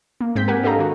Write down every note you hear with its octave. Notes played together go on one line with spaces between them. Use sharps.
A#3
G#2 G#3 C4 G6 B6
G4 A#4 F#5 G#5
D4 G4 A4 D#5 F5 A#5
D#3 F#4